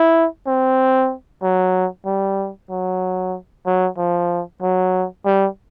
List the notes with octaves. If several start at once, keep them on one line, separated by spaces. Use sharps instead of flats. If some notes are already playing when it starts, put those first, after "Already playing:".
Already playing: E4
C4
F#3
G3
F#3
F#3
F3
F#3
G3